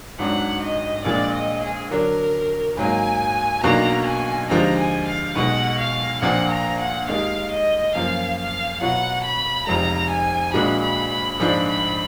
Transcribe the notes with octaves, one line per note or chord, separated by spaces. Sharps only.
G#1 G#2 F#3 D4 F#5
D#5
A#1 A#2 G#3 D4 D5
D#5
G#4
D3 F#3 D4 A#4
G#2 F#3 A#3 G#5
B1 B2 A#3 D4 F#4 A#5
G#5
D#2 D3 F3 G#3 A#5
G#5
F5
B1 B2 G#3 F#5
F5
A#1 A#2 F3 A#3 D4 F#5
A#5
F#5
D#2 D#3 G#3 F5
D#5
F#2 F3 A#3 F5
F5
B2 F#3 B3 F4 F#5
B5
F1 F2 F3 G#3 A#5
G#5
A#1 A#2 G#3 D4 F#4 B5
B5
B5
A#1 G#2 F3 G#3 D4 B5
B5